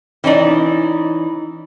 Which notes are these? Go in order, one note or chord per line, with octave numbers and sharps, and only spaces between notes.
E3 C#4 D#4 D5